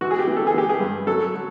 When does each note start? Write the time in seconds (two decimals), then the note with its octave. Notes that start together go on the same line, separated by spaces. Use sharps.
0.01 E3 F#4
0.11 G#4
0.19 G4
0.28 E3
0.37 A4
0.47 G#4
0.54 E3 G4
0.69 G#4
0.80 G2
1.07 F#3 A4
1.34 F#3